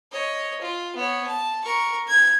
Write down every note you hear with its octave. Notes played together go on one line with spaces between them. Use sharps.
C#5 D#5
F4
B3 C#5
A5
A#4 C#6
G#6